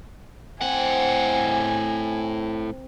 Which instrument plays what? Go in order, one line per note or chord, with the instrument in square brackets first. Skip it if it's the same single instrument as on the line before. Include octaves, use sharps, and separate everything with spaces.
[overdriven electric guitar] A2 F#5 [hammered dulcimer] C4 [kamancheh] G#5